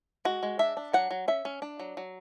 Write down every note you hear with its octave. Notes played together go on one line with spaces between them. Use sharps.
G#3 F#4
G#3
D4 E5
D4
F#3 F#5
F#3
C#4 E5
C#4
D4
F#3
F#3